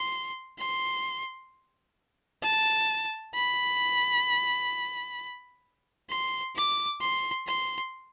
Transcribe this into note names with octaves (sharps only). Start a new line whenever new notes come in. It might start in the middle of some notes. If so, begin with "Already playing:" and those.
Already playing: C6
C6
A5
B5
C6
D6
C6
C6